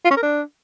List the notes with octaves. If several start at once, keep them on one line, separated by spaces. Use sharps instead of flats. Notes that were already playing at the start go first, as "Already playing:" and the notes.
F4
C#4
A#4
D4